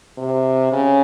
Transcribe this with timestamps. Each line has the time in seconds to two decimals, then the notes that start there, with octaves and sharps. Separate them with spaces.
0.18 C3
0.72 C#3